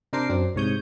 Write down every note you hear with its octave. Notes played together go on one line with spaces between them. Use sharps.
C3 D4 A#4 C5 D6 C7
F#2 C4 D4
C2 G#2 C3 C#5 D#6 G6